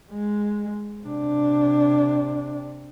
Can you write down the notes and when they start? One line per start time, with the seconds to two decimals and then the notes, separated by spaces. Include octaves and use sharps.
0.11 G#3
1.03 C3 D4